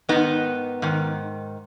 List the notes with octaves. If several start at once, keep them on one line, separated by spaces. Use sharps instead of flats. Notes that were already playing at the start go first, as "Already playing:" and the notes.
G#2 D#3 B3 D#4
G#2 D#3